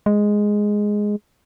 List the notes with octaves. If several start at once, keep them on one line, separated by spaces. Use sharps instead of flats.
G#3